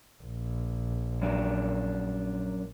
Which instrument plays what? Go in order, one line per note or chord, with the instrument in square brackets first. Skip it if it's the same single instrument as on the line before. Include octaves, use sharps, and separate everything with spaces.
[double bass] A#1
[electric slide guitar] F#2 D4